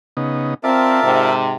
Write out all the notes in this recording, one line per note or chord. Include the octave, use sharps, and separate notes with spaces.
C#3 B3 D#4
C4 F4 A#4 D5 E5 A5
G#2 C3